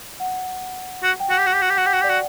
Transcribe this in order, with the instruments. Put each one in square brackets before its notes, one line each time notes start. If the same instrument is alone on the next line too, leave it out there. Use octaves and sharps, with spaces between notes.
[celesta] F#5
[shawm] F#4
[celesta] G5
[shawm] F#4 [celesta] F#5
[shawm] G4
F#4
G4
F#4
G4
[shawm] F#4 [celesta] F#5
[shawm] G4 [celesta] G5
[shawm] F#4
[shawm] G4 [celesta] D5
[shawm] F#4